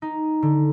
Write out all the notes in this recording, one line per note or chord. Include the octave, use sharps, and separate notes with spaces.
D#4
D3